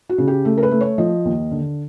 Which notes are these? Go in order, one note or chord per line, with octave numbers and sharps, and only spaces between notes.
F#4
C#3
G4
A3
A#4
B4
A3
C#5
F3 D#5
D#2
D3